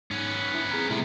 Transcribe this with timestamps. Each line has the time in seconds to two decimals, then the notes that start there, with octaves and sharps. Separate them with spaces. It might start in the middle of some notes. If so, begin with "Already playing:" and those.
0.11 G#2 B3 C#4
0.53 D4 E4 B5
0.71 C4 G#4 A#5
0.90 C3 G3 A3 B3 E4